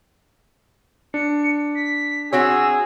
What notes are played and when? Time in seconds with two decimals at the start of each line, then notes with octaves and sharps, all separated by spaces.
1.14 D4 C#7
1.75 B6
2.33 C4 F#4 G#4 C#5 E6